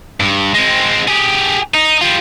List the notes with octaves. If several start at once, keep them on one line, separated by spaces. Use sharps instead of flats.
G2
G#3 C4
G4 G#4
D#4
G3 F4